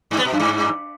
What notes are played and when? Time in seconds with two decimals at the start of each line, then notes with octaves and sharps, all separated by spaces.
0.11 G2
0.18 B3
0.25 B2
0.32 F#2
0.40 G2